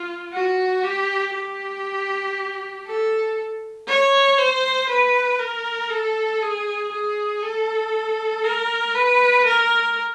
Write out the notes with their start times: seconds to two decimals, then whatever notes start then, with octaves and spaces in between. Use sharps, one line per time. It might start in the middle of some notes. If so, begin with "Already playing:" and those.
Already playing: F4
0.32 F#4
0.83 G4
1.34 G4
2.86 A4
3.88 C#5
4.38 C5
4.90 B4
5.39 A#4
5.91 A4
6.42 G#4
6.92 G#4
7.42 A4
8.44 A#4
8.95 B4
9.46 A#4